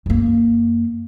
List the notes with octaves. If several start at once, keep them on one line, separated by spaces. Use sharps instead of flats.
F#2 A#3